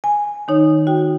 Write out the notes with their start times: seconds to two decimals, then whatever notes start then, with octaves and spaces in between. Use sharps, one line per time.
0.04 G#5
0.48 D#3 D#4 C#5
0.87 F#4 G5